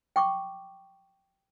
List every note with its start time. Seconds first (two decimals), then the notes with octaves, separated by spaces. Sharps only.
0.16 G5 C#6 D6